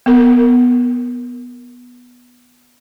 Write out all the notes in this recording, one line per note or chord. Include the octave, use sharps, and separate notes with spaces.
B3 A#4